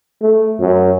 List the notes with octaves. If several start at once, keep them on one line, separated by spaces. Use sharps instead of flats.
A3
F#2